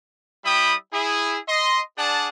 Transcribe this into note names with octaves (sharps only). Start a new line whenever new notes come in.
G3 E4 E5 G5 B5 D#6
E4 G#4
D#5 C6
D4 G#4 D5 F#5 A5